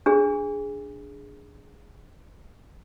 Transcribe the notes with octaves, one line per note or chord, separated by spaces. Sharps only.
D4 G#4